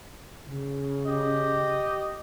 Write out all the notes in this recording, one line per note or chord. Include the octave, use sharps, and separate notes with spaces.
C#3
G4 D#5